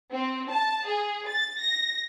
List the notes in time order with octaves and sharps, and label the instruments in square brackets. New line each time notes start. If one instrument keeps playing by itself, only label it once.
[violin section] C4
A5
G#4
A6
A#6